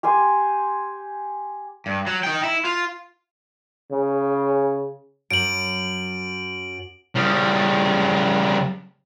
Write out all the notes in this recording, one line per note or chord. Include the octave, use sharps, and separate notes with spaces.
G4 G#5 C6
G2
F#3
D#4 G5
E4
F4
C#3
F#2 D7 F#7
C#3 G3